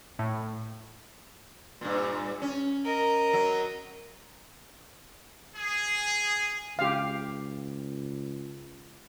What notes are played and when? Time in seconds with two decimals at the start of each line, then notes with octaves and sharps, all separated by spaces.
0.19 A2
1.81 G2 A#2
2.42 C#4
2.85 A#4 D#5
3.33 F#3
5.56 G#4
6.79 C#2 G4 F5